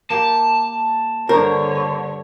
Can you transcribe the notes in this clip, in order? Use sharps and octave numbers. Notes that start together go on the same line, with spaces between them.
A#3 G4 A5
G2 D3 A#4 C5 C#5